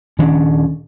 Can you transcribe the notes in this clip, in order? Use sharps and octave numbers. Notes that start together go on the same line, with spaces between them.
D#1 D#3 C#4 D4